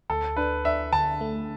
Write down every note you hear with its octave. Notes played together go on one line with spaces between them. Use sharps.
D2 A4
D4 B4
D4 E5
D3 A5
A3